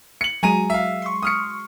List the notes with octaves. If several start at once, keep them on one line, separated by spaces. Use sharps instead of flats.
C#7 F#7
F#3 G#3 G#5 A#5 D#7
E5 F5
C6 C#6
D#6 F6 C#7